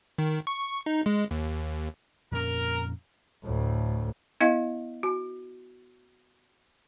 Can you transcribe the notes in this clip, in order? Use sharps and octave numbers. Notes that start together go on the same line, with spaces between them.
D#3
C#6
D#4
G#3
D#2
F2 A#2 C#4 A#4
D2 A2
B3 E4 D#5 F5
F#4